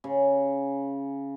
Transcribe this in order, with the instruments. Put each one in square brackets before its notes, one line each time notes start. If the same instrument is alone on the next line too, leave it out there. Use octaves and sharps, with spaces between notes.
[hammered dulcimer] C#3